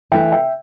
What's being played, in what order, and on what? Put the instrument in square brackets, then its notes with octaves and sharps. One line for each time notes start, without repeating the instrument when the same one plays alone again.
[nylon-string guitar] E3 A3 E4 [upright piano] E5 G5
[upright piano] E5 G5